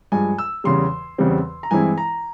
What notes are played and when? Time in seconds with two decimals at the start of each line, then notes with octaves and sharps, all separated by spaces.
0.12 G2 F3 G#3 G#5
0.38 E6
0.64 E2 C#3 G3 C6
1.18 E2 C#3 G3 C4
1.63 A#5
1.71 G2 E3 G#3 C4 E4 G#5
1.98 A#5